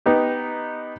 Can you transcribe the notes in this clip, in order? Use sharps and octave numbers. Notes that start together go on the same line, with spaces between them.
B3 D#4 G4